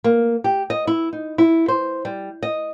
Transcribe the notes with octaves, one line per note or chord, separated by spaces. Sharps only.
A#3
G4
D#5
E4
D#4
E4
C5
G3
D#5